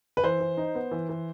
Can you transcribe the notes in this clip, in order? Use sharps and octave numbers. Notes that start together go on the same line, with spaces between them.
B4
E3 C5
E3
D#4
B3
E3
E3